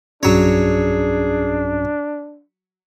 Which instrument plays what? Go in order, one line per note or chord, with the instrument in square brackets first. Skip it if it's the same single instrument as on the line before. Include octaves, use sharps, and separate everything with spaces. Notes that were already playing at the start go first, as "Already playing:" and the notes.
[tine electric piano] B1 G2 C#4 [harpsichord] F#3 C#5 [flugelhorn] D4 [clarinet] G#4